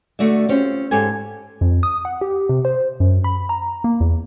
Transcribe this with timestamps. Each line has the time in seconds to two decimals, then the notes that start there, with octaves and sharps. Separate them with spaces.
0.19 D3 A3 F#4 D5 E5
0.49 C4 C#4 F4 G4
0.91 G#2 G4 A4 C#5 G#5
1.61 F2
1.83 D#6
2.05 F#5
2.21 G4
2.49 C3
2.65 C5
3.00 F#2
3.24 B5
3.49 A#5
3.84 A#3
4.00 E2